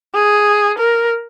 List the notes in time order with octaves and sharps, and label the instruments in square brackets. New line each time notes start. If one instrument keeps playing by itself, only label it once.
[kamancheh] G#4
A#4